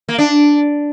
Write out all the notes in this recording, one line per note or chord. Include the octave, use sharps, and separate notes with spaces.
A#3
D4